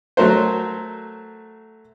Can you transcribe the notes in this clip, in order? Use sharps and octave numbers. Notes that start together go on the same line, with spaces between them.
F#3 A3 F#4 A#4 C5